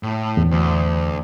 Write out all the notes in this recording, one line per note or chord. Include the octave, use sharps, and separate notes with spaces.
A2
E2
D2